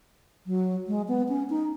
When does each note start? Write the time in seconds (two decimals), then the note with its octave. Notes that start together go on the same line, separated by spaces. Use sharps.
0.46 F#3
0.88 G#3
1.08 B3
1.29 C#4
1.50 D#4